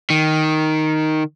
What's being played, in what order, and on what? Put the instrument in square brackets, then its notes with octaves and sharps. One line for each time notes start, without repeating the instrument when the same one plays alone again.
[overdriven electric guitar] D#3